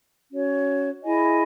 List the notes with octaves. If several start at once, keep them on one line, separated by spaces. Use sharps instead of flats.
C#4 F#4 C#5
E4 G#4 D#5 G#5